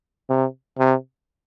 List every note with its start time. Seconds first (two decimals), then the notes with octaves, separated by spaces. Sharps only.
0.30 C3
0.79 C3